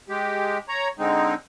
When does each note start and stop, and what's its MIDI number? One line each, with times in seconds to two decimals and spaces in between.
0.09 0.58 56
0.09 0.58 67
0.69 0.88 73
0.69 0.88 82
0.99 1.34 50
0.99 1.34 56
0.99 1.34 60
0.99 1.34 63